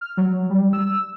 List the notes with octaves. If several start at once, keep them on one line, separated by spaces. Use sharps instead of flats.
F6
F#3
G3
E6